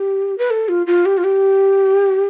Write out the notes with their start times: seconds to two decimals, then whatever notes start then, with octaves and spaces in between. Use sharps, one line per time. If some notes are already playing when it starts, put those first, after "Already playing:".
Already playing: G4
0.38 B4
0.51 A4
0.69 F4
0.87 F4
1.05 G4
1.18 F4
1.24 G4